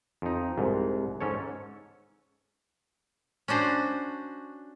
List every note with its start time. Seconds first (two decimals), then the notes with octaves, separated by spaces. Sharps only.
0.22 F2 D#4
0.58 C2 G#2
1.21 G#2 C#4 A4 C#5
3.48 C#4 D4 F#4 C5